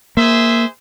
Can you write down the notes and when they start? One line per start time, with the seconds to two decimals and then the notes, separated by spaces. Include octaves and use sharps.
0.17 A#3 G#4 C5 E5